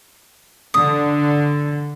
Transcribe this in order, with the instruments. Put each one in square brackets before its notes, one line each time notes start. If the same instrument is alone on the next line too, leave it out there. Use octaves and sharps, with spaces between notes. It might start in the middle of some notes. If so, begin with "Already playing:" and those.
[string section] D3 [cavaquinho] D#6